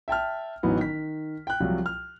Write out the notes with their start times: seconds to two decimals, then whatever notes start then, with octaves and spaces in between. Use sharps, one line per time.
0.08 E5 G5 A5 F6
0.63 A1 E3 F#3 B3 D#4
0.77 D#3 B6
1.47 G5 F#6
1.60 C2 C3 F3 F#3
1.86 F6